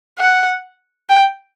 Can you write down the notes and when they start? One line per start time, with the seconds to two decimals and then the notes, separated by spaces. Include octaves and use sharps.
0.19 F#5
1.09 G5